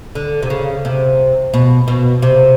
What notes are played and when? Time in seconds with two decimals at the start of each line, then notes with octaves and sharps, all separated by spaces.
0.15 D3
0.42 C3
0.50 C#3
0.85 C3
1.54 B2
1.88 B2
2.22 C3